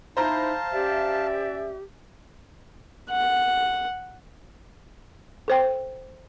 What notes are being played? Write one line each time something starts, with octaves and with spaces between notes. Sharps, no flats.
D#4 E4 C5 F5 A5 A#5
C#4 G4 D5 E5
F#5
A4 C5 G5